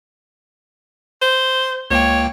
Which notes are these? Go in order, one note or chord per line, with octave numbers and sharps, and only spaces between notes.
C5
C#2 A#3 C#5 G5